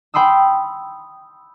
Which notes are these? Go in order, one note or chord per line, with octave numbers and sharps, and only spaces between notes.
G5 B5 C6 D#6 E6